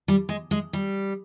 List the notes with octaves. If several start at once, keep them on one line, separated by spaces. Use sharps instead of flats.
G3
G#3
G#3
G3